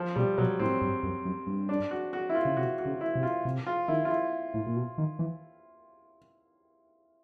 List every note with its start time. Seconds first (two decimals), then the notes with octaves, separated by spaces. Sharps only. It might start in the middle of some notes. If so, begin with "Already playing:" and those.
Already playing: F3
0.16 B2 G3
0.38 B2 F#3
0.60 A2 C4
0.82 G2
1.03 F#2
1.25 F#2
1.47 G2
1.69 D4
1.91 F#4
2.13 F#4
2.29 E4
2.35 F4
2.45 C#3
2.57 C3 F#4
2.79 F#4
2.86 C#3
3.01 E4
3.15 C3
3.23 F4
3.45 C3
3.67 F4
3.88 D#3 E4
4.05 F4
4.10 E4
4.54 A2
4.67 A#2
4.76 B2
4.98 D#3
5.19 E3